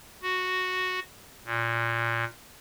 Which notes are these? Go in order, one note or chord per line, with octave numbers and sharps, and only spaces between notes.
F#4
A#2